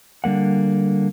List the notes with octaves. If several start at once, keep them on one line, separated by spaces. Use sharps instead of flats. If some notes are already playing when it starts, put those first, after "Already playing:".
D3 G3 A#3 F#5